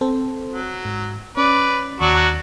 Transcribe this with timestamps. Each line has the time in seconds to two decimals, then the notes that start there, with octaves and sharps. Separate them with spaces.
0.01 C4 A4 C5
0.51 F#3
0.85 G#2
1.37 C#4 B4 D5
2.01 D#2 F#3 D4 F#4